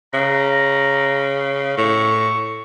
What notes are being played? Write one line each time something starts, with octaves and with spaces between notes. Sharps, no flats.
C#3 A#5
A2 C#6